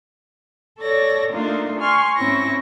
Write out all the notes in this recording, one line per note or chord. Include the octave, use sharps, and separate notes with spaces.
A4 C#5 D5 A#6
A3 A#3 D4 D#4 F4
G#5 C6 C#6 F6
G#2 C4 C#4 E4 C#6 A#6